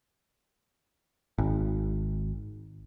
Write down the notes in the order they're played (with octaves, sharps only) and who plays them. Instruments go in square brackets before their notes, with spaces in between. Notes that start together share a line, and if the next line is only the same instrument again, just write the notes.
[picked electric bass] G#1